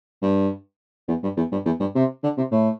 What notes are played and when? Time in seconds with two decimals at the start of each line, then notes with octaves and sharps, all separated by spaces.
0.22 G2
1.08 E2
1.23 G2
1.37 E2
1.52 G2
1.65 E2
1.80 G2
1.95 C3
2.23 D3
2.37 C3
2.52 A2